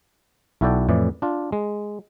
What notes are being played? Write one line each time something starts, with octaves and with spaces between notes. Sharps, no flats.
B1 E4 F#4 A4 D5 G5
F2 A2 E3 D5
D4 F4
G#3